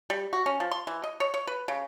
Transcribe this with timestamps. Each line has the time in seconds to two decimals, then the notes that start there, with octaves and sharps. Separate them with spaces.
0.10 G3
0.33 F#4
0.46 C#4
0.60 F3
0.71 C6
0.87 E3
1.04 D#5
1.20 C#5
1.34 C#5
1.47 B4
1.68 C#3